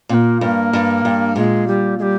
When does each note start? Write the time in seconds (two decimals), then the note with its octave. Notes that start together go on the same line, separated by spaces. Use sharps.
0.09 A#2 C4
0.14 A#3
0.41 G2 A#3
0.73 G2
1.05 G2
1.36 A#2 G#3
1.67 G3
1.99 G#3
2.02 G3